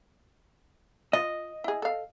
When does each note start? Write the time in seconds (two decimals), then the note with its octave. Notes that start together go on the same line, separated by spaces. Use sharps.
1.13 F4 D#5
1.64 E4 G#4
1.82 A4 F5